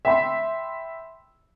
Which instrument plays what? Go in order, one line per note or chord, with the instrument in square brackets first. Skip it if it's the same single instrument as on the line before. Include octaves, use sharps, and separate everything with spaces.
[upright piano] E5 G5 B5 C6